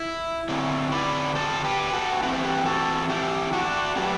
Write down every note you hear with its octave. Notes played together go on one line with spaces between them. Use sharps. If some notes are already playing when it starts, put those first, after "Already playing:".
Already playing: E4
D3 F#3 C4 E4
B4 D5
A4 C5
G4 B4
F#4 A4
E3 A3 C4 B4
C5
G4 B4
F#4 A4
E4 G4
D4 F#4
A2 F#3 A3 C4 G4 B4